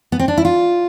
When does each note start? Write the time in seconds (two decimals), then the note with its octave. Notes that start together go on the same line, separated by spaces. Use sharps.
0.12 B3
0.19 C4
0.28 D4
0.37 E4
0.45 F4